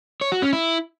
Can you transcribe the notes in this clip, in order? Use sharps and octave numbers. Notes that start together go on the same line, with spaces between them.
C#5
F#4
C#4
E4